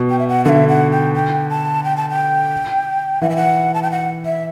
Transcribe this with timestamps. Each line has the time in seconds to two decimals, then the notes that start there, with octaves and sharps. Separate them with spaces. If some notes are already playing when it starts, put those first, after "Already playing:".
Already playing: B2
0.10 G5
0.19 E5
0.28 F#5
0.45 D3 E5 F#5
0.68 F#5
0.91 G5
1.14 G5
1.50 A5
1.84 G5
1.97 A5
2.10 G5
3.22 E3 F#5
3.30 E5
3.37 F#5
3.74 A5
3.83 G5
3.92 F#5
4.26 E5